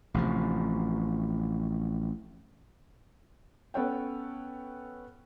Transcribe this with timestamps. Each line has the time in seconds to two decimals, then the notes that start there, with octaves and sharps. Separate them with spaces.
0.14 A1 C3 F3
3.74 B3 C#4 A4 C#5 F#5 G5